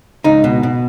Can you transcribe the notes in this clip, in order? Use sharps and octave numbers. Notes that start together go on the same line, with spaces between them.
C#2 D#4
B2
B2